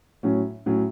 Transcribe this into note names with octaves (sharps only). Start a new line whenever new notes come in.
A2 F#3 C#4
A2 F#3 C#4